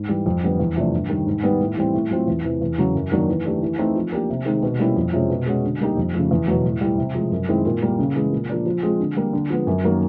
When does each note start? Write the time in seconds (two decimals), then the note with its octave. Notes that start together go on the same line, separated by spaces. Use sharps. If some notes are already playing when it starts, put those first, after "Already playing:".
Already playing: G#2
0.09 E3 G3
0.26 F2
0.43 D3 G3 B3
0.59 E2
0.76 C3 F3 A3 D4
0.93 G2
1.10 D#3 G3
1.27 G#2
1.43 D#3 G3 B3
1.60 A2
1.77 E3 G3 C4 E4
1.94 A2
2.11 F#3 A3 C4 F4
2.27 E2
2.44 C3 E3
2.61 E2
2.78 C#3 F#3
2.95 F#2
3.12 D#3 F#3 A#3 D4
3.28 E3
3.45 A3 D4 G4
3.62 E3
3.79 A3 C4 D#4
3.96 F3
4.12 A#3 D4 G4
4.30 C3
4.46 D#3 G#3 C4 D#4
4.63 B2
4.79 G3 A#3 C#4 E4
4.96 F2
5.13 C3 F3 G#3 C#4
5.30 B2
5.46 G#3 C#4 F#4
5.64 D3
5.80 G3 A#3 D#4 G4
5.97 F2
6.14 C#3 F3 A3
6.31 E2
6.48 B2 F#3
6.64 A2
6.81 E3 G3
6.98 C3
7.15 F3 G#3
7.32 F#2
7.49 D#3 G#3 C4 E4
7.66 A#2
7.82 G3 A#3
7.99 C#3
8.16 E3 G#3
8.32 A#2
8.49 F3 A#3 D4
8.66 F3
8.83 G#3 C4 F4 G#4
9.00 D3
9.17 G3 A#3
9.33 D3
9.50 F3 G#3 B3
9.67 F#2
9.84 D#3 F#3 A#3